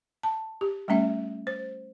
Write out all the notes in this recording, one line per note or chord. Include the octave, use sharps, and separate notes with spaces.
A5
G4
G3 A3 C#4 E5
C5